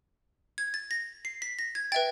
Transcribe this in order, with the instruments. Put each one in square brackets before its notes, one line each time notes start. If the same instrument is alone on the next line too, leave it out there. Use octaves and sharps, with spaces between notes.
[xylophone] G#6
A6
A#6
C7
B6
A#6
G#6
B4 E5 G5 A6